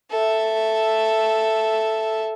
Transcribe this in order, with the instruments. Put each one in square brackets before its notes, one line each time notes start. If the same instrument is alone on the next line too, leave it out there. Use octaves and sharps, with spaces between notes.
[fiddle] A4 E5